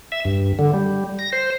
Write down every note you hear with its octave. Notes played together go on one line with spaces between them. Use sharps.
E5
G2
D3
G3
A#6
C5